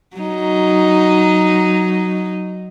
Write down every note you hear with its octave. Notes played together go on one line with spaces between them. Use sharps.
F#3 D#4